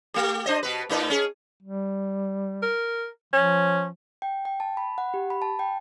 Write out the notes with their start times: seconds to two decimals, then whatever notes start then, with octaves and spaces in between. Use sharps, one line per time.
0.14 A3 G4
0.46 D4 C5 D#5
0.63 B2 B4
0.89 A2 D#4 B4
1.10 C#4 G#4
1.62 G3
2.62 A#4
3.33 F3 C#4
4.22 G5
4.45 G5
4.60 A5
4.77 B5
4.98 F#5
5.14 G4
5.30 B5
5.42 A5
5.59 G5